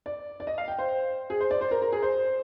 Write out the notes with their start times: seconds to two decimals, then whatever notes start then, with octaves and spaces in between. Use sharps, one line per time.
0.06 D5
0.40 D5
0.47 D#5
0.58 F5
0.68 G5
0.78 C5
1.30 G#4
1.40 C5
1.51 D5
1.61 C5
1.71 A#4
1.82 A#4
1.92 G#4
2.02 C5